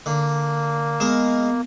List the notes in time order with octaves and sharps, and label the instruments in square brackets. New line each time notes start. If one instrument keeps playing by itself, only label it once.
[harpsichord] D3 [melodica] A#3
[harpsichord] G#3 A#4 [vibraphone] B3